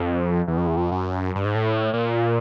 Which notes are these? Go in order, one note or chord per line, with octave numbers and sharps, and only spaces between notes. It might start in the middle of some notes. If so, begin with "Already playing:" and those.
Already playing: F2
E2
F2
E2
F2
F#2
G2
G#2
A2
A#2